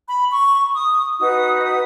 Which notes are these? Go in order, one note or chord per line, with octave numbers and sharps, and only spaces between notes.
B5
C#6
D#6
D#4 F#4 B4 D#6
D#6